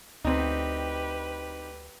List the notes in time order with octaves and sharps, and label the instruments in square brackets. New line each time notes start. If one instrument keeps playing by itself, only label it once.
[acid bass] D2 [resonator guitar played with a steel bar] C4 D#4 [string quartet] G4 B4